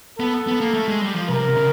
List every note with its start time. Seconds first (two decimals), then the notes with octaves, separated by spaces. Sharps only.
0.19 B3 A4
0.47 B3
0.61 A#3
0.74 A3
0.88 G#3
1.02 G3
1.15 F3
1.29 C3 A#4
1.48 C3
1.56 C#3